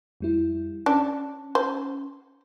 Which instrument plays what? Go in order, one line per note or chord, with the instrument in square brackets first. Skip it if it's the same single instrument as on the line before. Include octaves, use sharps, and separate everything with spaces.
[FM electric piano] F2 G3 E4
[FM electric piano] C#4 [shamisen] D4
[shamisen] C5